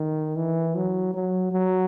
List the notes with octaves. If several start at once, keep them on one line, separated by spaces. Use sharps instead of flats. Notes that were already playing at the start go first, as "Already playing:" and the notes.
Already playing: D#3
E3
F#3
F#3
F#3